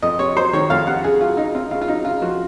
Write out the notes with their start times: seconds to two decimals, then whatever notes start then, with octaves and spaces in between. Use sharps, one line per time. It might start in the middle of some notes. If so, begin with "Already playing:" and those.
0.03 F2 D#5
0.19 C3 C#5
0.36 F#3 C5
0.53 D#3 C#5
0.70 F2 F5
0.87 C3 F#5
1.04 C#3 G#4
1.21 F#3 F4
1.37 C#3 D#4
1.55 C4 F4
1.71 C#3 F4
1.81 F4
1.88 F#3 D#4
2.05 C#3 F4
2.22 F3 F#4